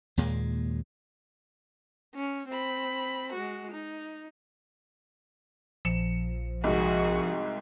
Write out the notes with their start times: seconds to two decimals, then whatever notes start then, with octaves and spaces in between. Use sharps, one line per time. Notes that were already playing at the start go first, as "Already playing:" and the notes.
0.17 D#2 A#2 G#3
2.15 C#4
2.48 C4 B5
3.33 G#3 F#4
3.72 D#4
5.85 A#1 F3 C#7 E7
6.64 C2 G#2 F#4 G#4